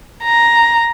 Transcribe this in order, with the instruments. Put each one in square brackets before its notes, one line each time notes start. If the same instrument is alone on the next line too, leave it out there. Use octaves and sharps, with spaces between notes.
[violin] A#5